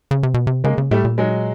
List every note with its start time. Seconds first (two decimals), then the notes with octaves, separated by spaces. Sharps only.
0.11 C#3
0.23 C3
0.34 B2
0.47 C3
0.64 C#3 G#3 A#3
0.78 C#3
0.91 A2 G3 A3
1.05 A#2
1.18 F#3 G#3